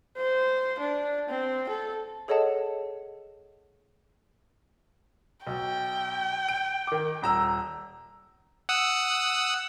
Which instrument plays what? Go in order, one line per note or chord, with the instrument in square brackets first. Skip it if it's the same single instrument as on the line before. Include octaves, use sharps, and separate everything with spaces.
[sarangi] C5
D4
C4
A4
[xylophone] G#4 A4 C#5 D#5 F#5 A5
[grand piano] B1 [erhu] G5
[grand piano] D7
D#3 D6
D#1 A#5 E6
[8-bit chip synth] F#5 D#6 E6